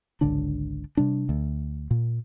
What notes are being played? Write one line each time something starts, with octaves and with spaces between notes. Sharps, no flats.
G#1 C#2 D3 D4
C3 G3 D4
D2
A#2